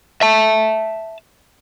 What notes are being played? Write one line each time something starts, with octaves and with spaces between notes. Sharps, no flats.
E5 A5